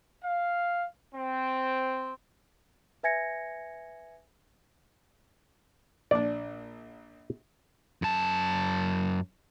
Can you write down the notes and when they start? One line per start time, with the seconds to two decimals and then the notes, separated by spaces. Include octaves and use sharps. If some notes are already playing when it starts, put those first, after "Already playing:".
0.24 F5
1.14 C4
3.03 B4 E5 G#5 G#6 A#6 C#7
6.11 A#1 D4 D5
8.02 F#2 A5